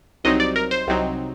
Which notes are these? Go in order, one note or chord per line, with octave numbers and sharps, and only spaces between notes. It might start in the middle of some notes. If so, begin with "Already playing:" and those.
C2 C3 F#3 C4 D#4 D#5
D5
A#4
C5
C2 C3 F#3 C4 D#4